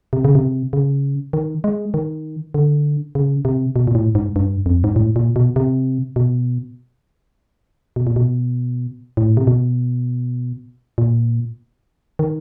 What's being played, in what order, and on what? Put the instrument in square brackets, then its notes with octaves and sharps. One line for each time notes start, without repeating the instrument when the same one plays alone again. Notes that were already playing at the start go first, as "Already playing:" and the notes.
[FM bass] C3
C#3
C3
C#3
D#3
G#3
D#3
D3
C#3
C3
B2
A#2
A2
G#2
G2
F2
G#2
A2
A#2
B2
C3
B2
B2
A#2
B2
A2
C3
B2
A#2
D#3